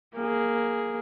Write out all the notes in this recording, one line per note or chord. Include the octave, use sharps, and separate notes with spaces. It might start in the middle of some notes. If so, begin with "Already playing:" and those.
A#3 G#4